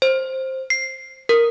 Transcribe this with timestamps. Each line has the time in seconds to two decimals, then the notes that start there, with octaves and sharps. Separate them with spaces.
0.02 C5
0.70 C7
1.29 A#4